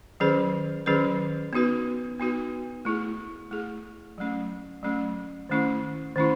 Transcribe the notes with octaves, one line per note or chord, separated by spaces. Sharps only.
D#3 F#3 C#4 G#4 B4
D#3 F#3 C#4 G#4 B4
B3 D#4 F#4 B4
B3 D#4 F#4 B4
A3 E4 G#4
A3 E4 G#4
F#3 A3 C#4
F#3 A3 C#4
D#3 A3 C#4 E4
D#3 A3 C#4 E4